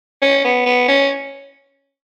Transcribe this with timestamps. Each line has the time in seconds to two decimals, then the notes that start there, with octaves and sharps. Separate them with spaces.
0.22 C#4
0.44 B3
0.66 B3
0.88 C#4